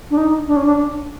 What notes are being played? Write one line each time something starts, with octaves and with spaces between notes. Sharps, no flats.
D4
D#4
D4
C#4
D4